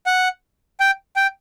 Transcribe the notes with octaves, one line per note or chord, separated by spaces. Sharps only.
F#5
G5
G5